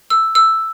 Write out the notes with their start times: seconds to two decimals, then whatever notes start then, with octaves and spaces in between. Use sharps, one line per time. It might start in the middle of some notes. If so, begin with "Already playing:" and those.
0.10 E6
0.35 E6